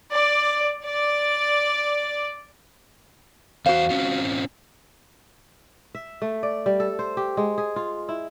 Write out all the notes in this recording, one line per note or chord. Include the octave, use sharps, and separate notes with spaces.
D5
D5
E2 F#4 C5 F5
C4 C#4 F4
E5
A3
D5
G3
A4
C5
G4
G#3
G#4
F4
E4